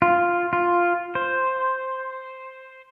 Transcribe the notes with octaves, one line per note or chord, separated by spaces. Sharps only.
F4
F4
C5